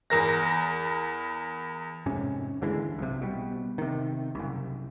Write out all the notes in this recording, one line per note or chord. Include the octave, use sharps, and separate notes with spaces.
E2 A#4 A#6
F2 G#2 C3 C#4
D#2 D3 E3 G#3
B1 C3
B2 G3
C3 D#3
F#1 C2